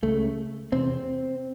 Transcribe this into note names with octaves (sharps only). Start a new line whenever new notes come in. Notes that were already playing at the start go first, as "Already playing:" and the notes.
C#2 C#3 A3
E2 C3 C4